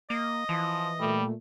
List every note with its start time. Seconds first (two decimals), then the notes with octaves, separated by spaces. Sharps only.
0.10 A#3 D#5
0.49 E3 F3
1.00 A#2 G3 A3